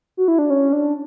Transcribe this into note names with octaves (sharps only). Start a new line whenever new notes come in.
F#4
E4
D4
C#4
D4